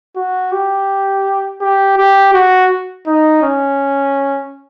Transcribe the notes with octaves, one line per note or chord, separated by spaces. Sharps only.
F#4
G4
G4
G4
F#4
D#4
C#4